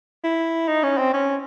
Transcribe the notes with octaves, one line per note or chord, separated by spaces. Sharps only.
E4
D#4
C#4
C4
C#4